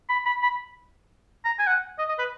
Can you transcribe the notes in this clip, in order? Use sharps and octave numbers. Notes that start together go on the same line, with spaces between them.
B5
B5
B5
A#5
G#5
F#5
D#5
D#5
B4